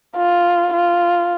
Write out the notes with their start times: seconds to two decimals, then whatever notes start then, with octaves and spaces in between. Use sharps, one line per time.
0.16 F4
0.73 F4